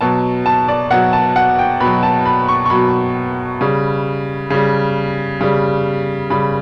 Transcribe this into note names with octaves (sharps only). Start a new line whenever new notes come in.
B2 F#3 A5
A5
D5
B2 F#3 F#5
A5
F#5
G5
B2 F#3 B5
A5
B5
C#6
C#6
B2 F#3 B5
C#3 G3
C#3 G3
C#3 G3
C#3 G3 B5